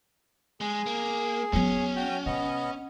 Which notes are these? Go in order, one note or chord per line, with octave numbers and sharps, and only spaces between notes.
G#3 G#4
A#3
F#3 B3 C#4
F#4 G5
C3 B3 D#5